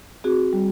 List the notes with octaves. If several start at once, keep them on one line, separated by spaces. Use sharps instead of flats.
C4 F#4 G#4
G3